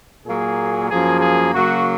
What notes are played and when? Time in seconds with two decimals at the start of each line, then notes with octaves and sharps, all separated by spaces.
0.25 A#2 F#3 A#3 G#4
0.89 F#2 F3 A#3 G#4
1.21 G#4
1.53 C#3 F#3 A#3 F#4